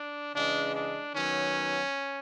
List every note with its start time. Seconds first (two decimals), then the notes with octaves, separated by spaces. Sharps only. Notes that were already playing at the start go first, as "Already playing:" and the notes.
Already playing: D4
0.34 C#3 E3 G#3 D4
0.74 D4
1.15 D#3 F#3 B3 C#4